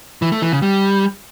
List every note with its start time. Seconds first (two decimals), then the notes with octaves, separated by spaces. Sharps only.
0.22 E3
0.32 A3
0.42 E3
0.52 C#3
0.62 G3